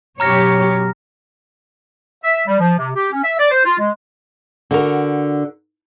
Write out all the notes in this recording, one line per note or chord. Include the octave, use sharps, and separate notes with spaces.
F#2 B2 F#3 G4 C#5 A#5 F6 A#6
E5
G3
F3
C3
G4
C#4
E5
D5
C5
F4
G#3
D3 F#4 A#4